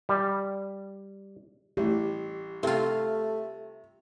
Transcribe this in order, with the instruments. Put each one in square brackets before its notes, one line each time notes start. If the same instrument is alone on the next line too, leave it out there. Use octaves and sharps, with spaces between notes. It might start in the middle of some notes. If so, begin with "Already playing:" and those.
[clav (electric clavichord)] G3
[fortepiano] A1 [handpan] G4
[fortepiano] C3 [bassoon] A3 [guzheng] C4 F4